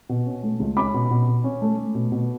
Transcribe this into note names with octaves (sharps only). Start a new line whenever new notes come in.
B2
C#4
A3
C#2
C#4 B5 D6
B2
B2
B2
C#4
A3
A3
B2
B2